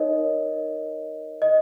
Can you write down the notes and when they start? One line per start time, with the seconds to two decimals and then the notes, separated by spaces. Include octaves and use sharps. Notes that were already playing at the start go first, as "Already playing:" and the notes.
Already playing: D#4 A#4 C#5 D#5
1.42 D#5